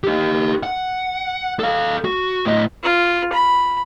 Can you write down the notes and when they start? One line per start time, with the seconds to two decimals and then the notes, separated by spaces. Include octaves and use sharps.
0.04 D#4 G4
0.63 F#5
1.59 A4 F5
2.05 F#4
2.46 A2 D#5
2.83 F4
3.33 B5